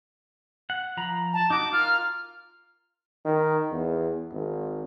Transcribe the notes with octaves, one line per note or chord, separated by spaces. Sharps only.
F#5
F3 A#5 B5
A5
D#4 F#4 D6
F4 A#4 F6
D#3
E2
G#1